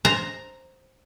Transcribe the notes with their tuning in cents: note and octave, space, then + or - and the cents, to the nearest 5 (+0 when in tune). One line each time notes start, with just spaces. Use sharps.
C5 +5 A#5 +0